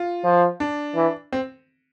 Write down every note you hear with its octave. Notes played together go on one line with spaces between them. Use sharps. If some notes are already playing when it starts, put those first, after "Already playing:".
Already playing: F4
F3
D4
E3
C4